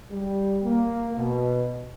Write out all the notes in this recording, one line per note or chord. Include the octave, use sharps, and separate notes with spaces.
G3
A#3
B2